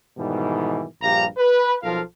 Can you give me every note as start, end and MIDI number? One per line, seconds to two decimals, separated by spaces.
0.18 0.85 44
0.18 0.85 47
0.18 0.85 51
0.18 0.85 52
0.18 0.85 55
1.02 1.25 34
1.02 1.25 43
1.02 1.25 67
1.02 1.25 77
1.02 1.25 82
1.37 1.76 71
1.83 2.01 35
1.83 2.01 53
1.83 2.01 65
1.83 2.01 69
1.83 2.01 70
1.83 2.01 77